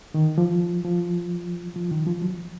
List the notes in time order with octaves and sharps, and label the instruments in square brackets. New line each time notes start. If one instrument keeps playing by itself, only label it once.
[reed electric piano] D#3
F3
F3
F3
D#3
F3
F#3